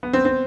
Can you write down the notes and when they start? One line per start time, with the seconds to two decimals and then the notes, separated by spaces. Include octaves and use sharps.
0.03 B3
0.13 C4
0.25 C4